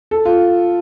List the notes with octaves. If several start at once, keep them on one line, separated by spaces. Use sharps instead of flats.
A4
F4